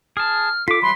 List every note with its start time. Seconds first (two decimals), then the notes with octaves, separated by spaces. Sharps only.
0.17 G#4 A5 F6
0.68 F4 A4 D6 B6
0.82 E3 F#3 G3 B5 C6